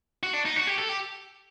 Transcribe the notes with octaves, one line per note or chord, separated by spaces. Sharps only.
F#4
D4
D#4
F#4
G4
A4
G4